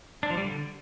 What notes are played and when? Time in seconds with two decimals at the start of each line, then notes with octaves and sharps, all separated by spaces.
0.23 D4
0.30 F3
0.37 G3
0.44 D3